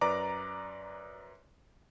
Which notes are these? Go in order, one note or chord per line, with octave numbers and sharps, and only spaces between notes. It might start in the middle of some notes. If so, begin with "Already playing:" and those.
F#2 B4 D5 A#5 D6